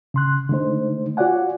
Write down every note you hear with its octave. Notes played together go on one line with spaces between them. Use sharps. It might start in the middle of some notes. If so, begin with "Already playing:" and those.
C#3 C6 F#6
D3 G#3 A3 D#4 C5
F4 F#4 C#5 D5 F#5 G#5